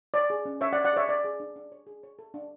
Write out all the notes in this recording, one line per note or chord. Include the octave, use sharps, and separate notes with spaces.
C#5 D5
G#4
C#4
C#4 C#5 E5
D5 F#5
C#5
D5 F#5
G#4 C#5 E5
C#5 D5
G#4
D4
D4
C#5
G#4
C#5
A4
D4